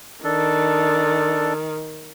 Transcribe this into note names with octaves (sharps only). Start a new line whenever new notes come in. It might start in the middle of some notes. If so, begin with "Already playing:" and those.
D#3 D4 A4